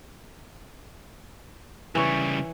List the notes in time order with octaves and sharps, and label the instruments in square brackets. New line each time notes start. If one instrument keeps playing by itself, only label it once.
[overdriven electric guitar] C#3 G3 [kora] E3 C#5